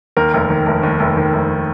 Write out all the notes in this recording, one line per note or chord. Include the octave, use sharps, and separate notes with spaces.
D#2 A#4
F1
D#3
F1
D#2
F1
D#3
F1